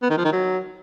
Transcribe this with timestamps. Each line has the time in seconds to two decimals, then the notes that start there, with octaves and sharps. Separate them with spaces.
0.02 B3
0.10 D#3
0.17 F3
0.25 D#3
0.32 F#3